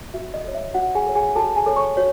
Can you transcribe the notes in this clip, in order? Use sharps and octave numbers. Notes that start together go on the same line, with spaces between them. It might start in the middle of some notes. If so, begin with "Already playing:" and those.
F#4 E5
D#5
A4 C#5
E5
F#4 F#5
G#4 G#5
A4 C#5
G#4 G#5
F#4 A4 A5
G#4 G#5
A4 C#5
C#5 C#6
F#4 C#5